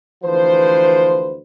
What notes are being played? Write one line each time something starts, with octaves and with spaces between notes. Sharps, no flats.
D2 E3 F3 B4 C5